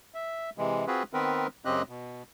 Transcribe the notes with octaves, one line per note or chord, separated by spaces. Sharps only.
E5
C3 E3 G#3
C4 F4 F#4 G#4 B4
D#3 B3 C4 A#4 B4
F#2 C#3 C4 G4 D#5 F#6
B2